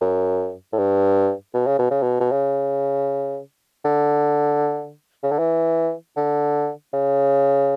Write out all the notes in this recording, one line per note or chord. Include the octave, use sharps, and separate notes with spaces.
F#2
A2
G2
B2
C#3
B2
C#3
B2
B2
C#3
D3
C#3
D3
E3
D3
C#3